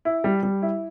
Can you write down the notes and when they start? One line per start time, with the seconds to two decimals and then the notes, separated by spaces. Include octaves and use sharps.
0.05 E4
0.24 G3
0.43 G3
0.62 E4